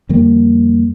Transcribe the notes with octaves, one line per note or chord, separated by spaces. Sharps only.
F2 D3 G3 A#3